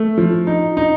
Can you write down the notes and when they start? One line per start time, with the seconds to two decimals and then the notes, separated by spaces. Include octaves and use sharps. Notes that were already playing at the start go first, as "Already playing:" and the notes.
Already playing: A3
0.18 F3
0.47 D#4
0.77 D#4